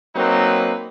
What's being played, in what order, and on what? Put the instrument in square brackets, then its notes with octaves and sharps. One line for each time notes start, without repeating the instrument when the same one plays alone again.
[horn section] F#3 A#3 C4 D#4 B4